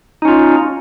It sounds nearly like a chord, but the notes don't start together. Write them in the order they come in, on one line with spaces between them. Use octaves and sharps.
D#4 C#4 F4